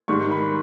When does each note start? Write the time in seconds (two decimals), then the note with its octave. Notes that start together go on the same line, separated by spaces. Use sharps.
0.08 G#2 D#3 G3 C#6
0.31 B5